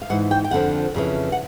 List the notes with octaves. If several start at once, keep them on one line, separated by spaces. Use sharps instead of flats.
F5
G#2 E3 F#5
G5
G5
F2 D3 F3 F#5
F2 C#3 E3
F#5